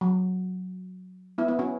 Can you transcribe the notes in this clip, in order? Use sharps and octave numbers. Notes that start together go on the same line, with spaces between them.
F#3
B3 E4
B3 E4
C#4 F#4